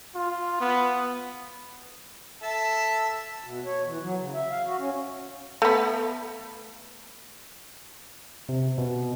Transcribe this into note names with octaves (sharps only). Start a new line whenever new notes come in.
F4
B3
A4 E5 A5
B2
C#5
E3
F#3
C#3
E5
F5
F#4
C#4
A3 B3
C3
B2